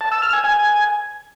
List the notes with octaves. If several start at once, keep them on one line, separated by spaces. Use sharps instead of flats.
A5
E6
F6
G#5
G#5